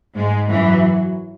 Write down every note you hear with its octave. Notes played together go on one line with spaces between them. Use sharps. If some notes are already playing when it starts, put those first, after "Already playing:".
G#2 G#3
F#2 E3 F#3